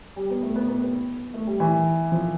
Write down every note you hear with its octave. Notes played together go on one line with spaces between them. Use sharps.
G3
B3
A3
B3
B3
B3
A3
G3
E3
F3